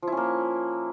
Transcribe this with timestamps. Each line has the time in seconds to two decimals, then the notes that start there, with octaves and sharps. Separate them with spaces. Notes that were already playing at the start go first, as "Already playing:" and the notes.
0.02 F3
0.07 E4
0.12 C#4
0.17 A#3